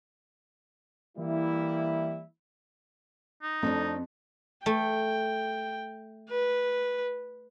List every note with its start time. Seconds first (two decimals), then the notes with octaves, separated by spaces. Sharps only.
1.18 E3 G3 A#3 E4
3.42 D#4
3.63 F2 A3 C4 D4
4.66 A3 G5
6.30 B4